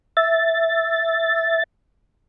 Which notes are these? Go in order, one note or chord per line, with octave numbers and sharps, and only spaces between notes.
E5 A6